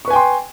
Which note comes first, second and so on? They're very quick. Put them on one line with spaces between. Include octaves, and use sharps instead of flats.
C#6 B4 G#5 G5 C6